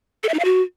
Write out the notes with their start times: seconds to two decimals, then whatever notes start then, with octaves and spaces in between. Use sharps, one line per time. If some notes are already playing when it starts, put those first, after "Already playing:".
0.23 A4
0.29 E5
0.34 D#4
0.39 F5
0.45 F#4